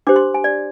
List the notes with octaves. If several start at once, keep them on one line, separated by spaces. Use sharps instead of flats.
D4 G4 C5 D6
C6
G#5
D5